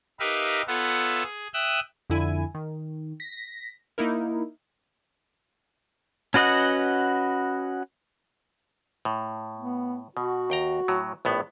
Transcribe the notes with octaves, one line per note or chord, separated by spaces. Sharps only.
D#4 G4 A#4 B4 E5 F5
B3 F4 A4 C#5 E5 F#5
G#4
E5 G5 D#6 E6 F#6
F2 D3 E4 G#5
D#3
A#6 B6
A#3 D#4 E4 A#4
C#4 F#4 B4 D#5 F#5
A2
B3
B2 F#4
D#2 G5 A#5
A2 F#3
A#1 A2 B3